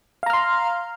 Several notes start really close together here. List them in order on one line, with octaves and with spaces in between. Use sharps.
F5 A#5 F6 C6